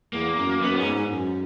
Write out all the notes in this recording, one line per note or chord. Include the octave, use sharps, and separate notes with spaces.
E2 A#3
F#2
F#2 B3
G#2 C#4
G#2
F#2